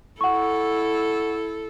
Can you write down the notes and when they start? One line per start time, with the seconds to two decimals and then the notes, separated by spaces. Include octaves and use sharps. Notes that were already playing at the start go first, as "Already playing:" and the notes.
0.21 E4 A4 F#5 C#6